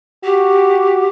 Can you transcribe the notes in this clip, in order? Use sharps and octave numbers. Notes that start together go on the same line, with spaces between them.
F#4 G4